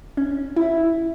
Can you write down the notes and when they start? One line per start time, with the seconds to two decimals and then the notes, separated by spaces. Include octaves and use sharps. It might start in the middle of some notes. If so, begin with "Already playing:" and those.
0.17 C#4
0.56 E4